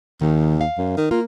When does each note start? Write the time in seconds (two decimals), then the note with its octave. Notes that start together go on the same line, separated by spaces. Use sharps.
0.21 D#2 D#3
0.61 F5
0.78 F#2
0.97 D#3
1.11 A#3 F4